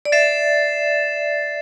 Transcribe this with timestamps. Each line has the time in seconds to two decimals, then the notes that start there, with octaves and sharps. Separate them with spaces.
0.05 D5
0.12 E5 A6 C7 E7